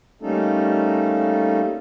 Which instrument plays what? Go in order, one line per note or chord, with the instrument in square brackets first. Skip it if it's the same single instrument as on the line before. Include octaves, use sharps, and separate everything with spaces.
[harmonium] G3 A3 A#3 C#4 D#4 A4